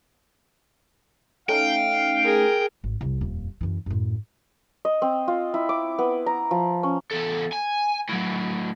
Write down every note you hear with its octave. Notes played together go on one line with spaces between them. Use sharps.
A3 C#4 D#4 F5 G5
G#4 A#4
G#1
C2 F2
D#1 F2
F#2 E3
F#2 A2
D#5
C4
F4
E4
D6
B3
A#5
F3
C#4
E2 A4
G#5
A2 F#3